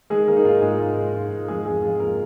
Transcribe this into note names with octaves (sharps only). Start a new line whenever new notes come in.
D#3 G#3 G#4
D#3 A#3 A#4
D#4
G#2 F4
G#2 G#3 G#4
G#2 F4
G#2
G#2 F4
G#2
F2 G#3 G#4
F2 G#3 G#4
F2 F4
F2 A#3 A#4